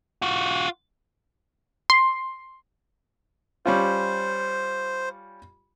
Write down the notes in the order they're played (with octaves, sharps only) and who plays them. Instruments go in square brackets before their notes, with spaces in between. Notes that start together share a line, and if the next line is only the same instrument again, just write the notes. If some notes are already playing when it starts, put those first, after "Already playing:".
[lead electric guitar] F4 F#4
[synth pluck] C6
[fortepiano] G3 C#4 F4 [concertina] C5